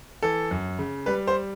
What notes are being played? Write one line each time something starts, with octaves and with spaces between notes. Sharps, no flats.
E3 A4
F#2
C#3
G3 B4
C5